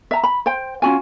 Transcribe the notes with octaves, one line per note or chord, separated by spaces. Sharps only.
E5 A#5
B5
C5 G5
C#4 F4 F#4 G#5